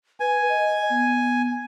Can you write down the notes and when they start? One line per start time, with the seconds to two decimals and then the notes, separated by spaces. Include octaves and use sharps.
0.20 B4 G#5
0.49 D#5
0.90 B3